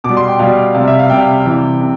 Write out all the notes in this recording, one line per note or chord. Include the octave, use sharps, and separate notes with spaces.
B2 D6
G3
C6
G5
B2 G3 F5
C3 F5
G3
E5
F5
C3 G3 G5
C3 E3 G3
C3